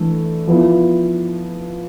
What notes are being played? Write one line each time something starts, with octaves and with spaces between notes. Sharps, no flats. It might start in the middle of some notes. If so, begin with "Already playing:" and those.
Already playing: E3 A3 D4
F3 B3 E4